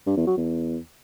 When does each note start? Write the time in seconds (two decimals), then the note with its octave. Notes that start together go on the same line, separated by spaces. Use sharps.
0.06 G2
0.17 E2
0.27 F#3
0.37 E2